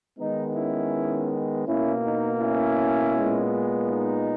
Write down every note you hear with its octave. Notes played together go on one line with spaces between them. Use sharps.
D#3 G#3 B3 D#4
C#4 E4
B2 A#3 C#4 E4
D#4
C#4 E4
A#2 G#3 B3
D#4